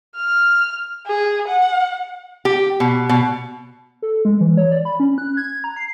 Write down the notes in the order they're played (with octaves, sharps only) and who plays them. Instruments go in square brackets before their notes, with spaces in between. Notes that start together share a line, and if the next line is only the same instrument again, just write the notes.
[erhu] F6
G#4
F#5
[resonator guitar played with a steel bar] G4
B2
B2
[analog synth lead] A4
G#3
E3
C#5
D5
B5
C#4
F#6
G#6
A#5
C7